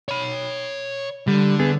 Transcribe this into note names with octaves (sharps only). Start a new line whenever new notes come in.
C#5 B5
D3 G3
B3 G#4